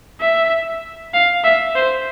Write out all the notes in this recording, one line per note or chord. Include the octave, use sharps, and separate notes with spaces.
E5
F5
E5
C5